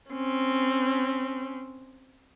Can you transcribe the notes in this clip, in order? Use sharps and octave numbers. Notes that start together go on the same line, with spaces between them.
C4 C#4